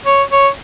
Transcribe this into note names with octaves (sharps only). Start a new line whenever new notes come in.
C#5
C#5